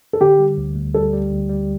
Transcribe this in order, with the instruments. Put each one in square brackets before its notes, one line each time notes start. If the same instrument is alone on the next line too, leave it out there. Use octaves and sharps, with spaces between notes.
[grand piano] A4
[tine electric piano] D3 [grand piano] G4
[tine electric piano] G3
D2
D2
[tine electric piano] G3 [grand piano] A4
[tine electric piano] G3
D2
G3